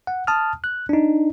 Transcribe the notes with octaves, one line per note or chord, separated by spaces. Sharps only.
F#5
A5 D#6 F6
F#6
D4 D#4